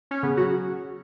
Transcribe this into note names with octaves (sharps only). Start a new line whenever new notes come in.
C#4
C#3 B3
F#3 F#4